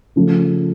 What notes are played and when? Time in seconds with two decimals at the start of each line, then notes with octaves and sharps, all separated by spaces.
0.16 C#3 F3 A3